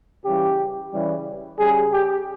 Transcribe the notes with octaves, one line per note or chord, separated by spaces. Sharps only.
C#3 E3 G3 G4
C#3 E3 G3
C#3 G3 G#4
G4